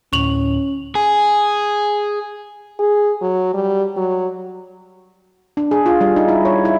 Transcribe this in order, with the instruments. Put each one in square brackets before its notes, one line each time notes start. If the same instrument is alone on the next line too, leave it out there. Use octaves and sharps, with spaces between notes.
[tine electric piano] D2 A2 [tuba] C#4 [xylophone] C#6 F7 F#7
[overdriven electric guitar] G#4
[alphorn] G#4
F#3
G3
F#3
[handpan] D4
G#4
F4
G3
D#4
E4
C#5
E4